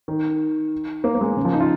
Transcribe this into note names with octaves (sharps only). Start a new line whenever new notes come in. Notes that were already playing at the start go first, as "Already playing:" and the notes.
D#3
A#3
A#3
G#3
C#3
F3
D#4
F4